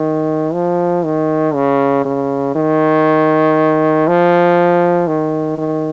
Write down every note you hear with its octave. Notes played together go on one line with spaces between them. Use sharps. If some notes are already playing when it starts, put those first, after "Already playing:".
Already playing: D#3
F3
D#3
C#3
C#3
D#3
F3
D#3
D#3